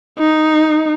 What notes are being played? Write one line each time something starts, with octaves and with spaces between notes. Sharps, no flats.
D#4